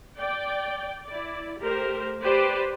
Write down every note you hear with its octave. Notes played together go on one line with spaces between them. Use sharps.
D5 G5
E4 D5
A3 G4 A#4 C5
G4 B4 C5 D5